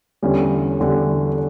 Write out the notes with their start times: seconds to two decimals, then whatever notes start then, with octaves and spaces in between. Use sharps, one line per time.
0.22 E2 D3 G3 C#4
0.80 E2 D3 G3